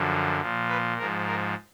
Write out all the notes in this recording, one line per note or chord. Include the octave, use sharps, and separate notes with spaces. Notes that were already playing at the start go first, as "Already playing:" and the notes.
Already playing: F#2 D3 F3
A#2 F3
B4
G#2 F3 A#4
A#4